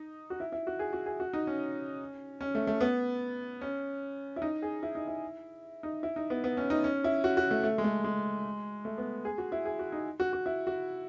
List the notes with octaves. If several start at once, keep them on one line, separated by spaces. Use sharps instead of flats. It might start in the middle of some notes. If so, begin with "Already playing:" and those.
Already playing: D#4
F#4
E4
E4
F#4
G#4
F#4
G#4
F#4
D#4
C#4
C#4
A3
A3
B3
C#4
E4
D#4
G#4
E4
D#4
E4
D#4
E4
D#4
B3
B3
C#4
D#4
C#4
E4
F#4
F#4
A3
A3
G#3
A3
G#3
A3
B3
G#4
F#4
E4
G#4
F#4
D#4
F#4
F#4
E4
F#4